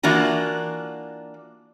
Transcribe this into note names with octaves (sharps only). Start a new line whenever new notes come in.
E3 A#3 D4 F4 F#4